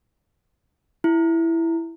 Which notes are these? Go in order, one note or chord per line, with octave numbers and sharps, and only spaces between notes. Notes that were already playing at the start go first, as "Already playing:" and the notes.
E4